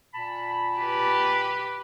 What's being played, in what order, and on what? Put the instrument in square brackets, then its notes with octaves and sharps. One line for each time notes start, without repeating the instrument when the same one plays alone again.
[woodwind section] A#2 A5 B5
[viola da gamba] G4 B4